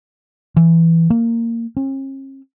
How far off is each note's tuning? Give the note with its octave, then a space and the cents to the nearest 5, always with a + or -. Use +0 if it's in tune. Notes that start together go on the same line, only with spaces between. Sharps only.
E3 +5
A#3 -15
C#4 -45